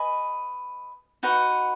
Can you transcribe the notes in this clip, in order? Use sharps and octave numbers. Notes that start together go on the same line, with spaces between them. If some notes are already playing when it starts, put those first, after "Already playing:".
Already playing: B4 D#5 G#5
D#4 F#4 B4 F#5